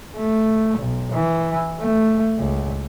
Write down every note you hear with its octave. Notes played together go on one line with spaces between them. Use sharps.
A3
B1
E3
A3
C#2